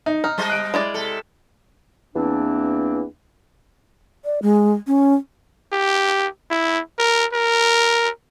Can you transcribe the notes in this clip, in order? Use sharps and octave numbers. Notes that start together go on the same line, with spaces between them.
D#4
D#4 F6
G3 C5 D#5
F#6 D7
G#3 E4 D5
C3 A4
E2 E3 A#3 C4 D4
D5
G#3
C#4
G4
E4
A#4
A#4